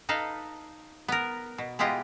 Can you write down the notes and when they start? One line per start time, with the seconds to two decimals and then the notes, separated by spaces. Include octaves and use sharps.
0.09 D#4 A4 B4 F5
1.08 B3 A#4
1.58 B2
1.79 G#3 B3 E4 F4 G4 D#5